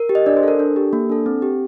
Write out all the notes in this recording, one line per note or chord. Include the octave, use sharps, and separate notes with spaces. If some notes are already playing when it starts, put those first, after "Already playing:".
Already playing: A#4
G4
D#5
D4 D5
C5
A4 A#4
D4 A4
G4
A#3
D4 A4
C4
G4